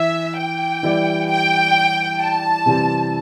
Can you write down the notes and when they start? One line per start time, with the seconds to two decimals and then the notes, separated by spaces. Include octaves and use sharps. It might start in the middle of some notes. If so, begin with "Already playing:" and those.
Already playing: E3 E5
0.37 G5
0.83 E3 G3 E4 G4 D5
1.29 G5
2.20 A5
2.66 C3 E3 G3 C4 G4